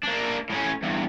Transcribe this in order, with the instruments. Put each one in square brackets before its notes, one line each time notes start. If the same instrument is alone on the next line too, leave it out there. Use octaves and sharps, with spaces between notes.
[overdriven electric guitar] A#3 D4
A2 C#4
E2 G2